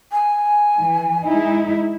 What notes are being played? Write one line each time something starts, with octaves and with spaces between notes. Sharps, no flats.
G#5
E3
G#3 D#4 E4